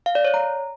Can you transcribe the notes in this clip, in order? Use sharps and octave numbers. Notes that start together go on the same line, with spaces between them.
F5
D5
C#5
A#5